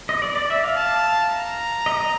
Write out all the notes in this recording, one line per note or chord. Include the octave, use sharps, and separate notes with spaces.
D#5
D5
D5
E5
F5
A5
A#5
D#5
D#5